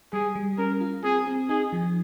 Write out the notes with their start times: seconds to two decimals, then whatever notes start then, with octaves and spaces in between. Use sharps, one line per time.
0.13 G3 G#4
0.36 G3
0.58 C#4 A#4
0.81 F4
1.04 C4 G#4
1.27 C4
1.49 D#4 G#4
1.73 F3